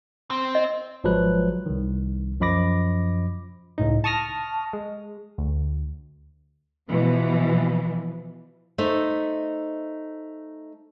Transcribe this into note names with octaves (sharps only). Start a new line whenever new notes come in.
C4
D#5
G#1 F3 F#3 G#3 B4 F#6
C2 D#3
F#2 F3 D#5 B5 D6 A#6
C#2 A2 D#4
A5 C#6 D#6 F6 A#6
G#3
D2
B2 E3 F3
A3 D#4 C5 E5